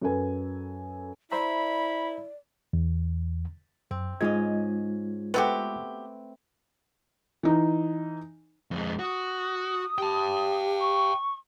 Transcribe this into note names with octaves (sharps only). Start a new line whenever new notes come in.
F#2 A4 B4 G#5
E4 C5 D5 E5 A#5 B5
E2
F#2 C4
G#2 G#3 C#4 F4 D#5 G#6
A3 B3 C4 F#4 G4 B4
E3 D#4
F2 G#3
F#4 D#6
G4 G5 A5
C#6